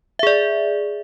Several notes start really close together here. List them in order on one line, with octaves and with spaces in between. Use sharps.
E5 G#4 D5